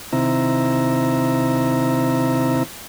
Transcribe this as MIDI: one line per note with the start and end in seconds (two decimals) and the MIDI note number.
0.13 2.63 48
0.13 2.63 51
0.13 2.63 60
0.13 2.63 64
0.13 2.63 76
0.13 2.63 82